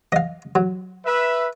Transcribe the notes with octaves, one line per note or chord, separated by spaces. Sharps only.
D#5 F5
F#3
B4 E5